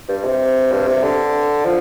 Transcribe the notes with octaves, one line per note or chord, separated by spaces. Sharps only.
G2
C3
G2
C3
D3
F3